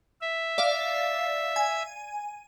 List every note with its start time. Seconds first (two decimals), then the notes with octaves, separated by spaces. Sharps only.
0.21 E5
0.58 D5 F5
1.56 G#5